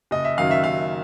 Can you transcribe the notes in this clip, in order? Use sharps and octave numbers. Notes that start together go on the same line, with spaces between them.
F#1 D#5
E5
F#2 D#3 F#3 F5
E5
F#1 F5